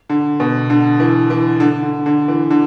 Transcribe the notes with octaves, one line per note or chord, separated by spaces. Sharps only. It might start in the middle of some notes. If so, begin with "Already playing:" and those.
D3
B2
D3
E3
E3
D3
D3
D3
E3
D3